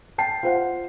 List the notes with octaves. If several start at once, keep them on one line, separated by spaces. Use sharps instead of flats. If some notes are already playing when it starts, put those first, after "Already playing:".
G5 A5 C7
F4 C5 F#5